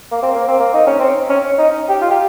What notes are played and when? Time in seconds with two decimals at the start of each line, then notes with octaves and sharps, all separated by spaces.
0.11 A#3
0.23 C4
0.35 A#3
0.48 C4
0.59 A#3
0.74 D#4
0.87 C#4
0.99 C4
1.30 C#4
1.58 D#4
1.89 G4
2.01 F4
2.11 G4